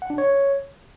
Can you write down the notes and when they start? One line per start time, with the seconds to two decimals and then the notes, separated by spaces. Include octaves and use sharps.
0.02 F#5
0.10 D4
0.18 C#5